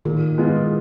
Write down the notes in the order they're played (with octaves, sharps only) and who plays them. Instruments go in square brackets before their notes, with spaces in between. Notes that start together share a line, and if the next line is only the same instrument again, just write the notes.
[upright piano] A#2 [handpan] D#3
[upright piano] G#3 B3 F4